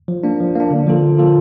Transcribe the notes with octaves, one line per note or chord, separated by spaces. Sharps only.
F3
A#3 D4
F3
A#3 D4
D3
F3 A#3 F4 A4
D3
F3 A#3 F4 A4